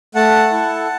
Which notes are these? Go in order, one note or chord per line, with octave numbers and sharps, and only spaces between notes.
A3 F#5 A5
E4 A4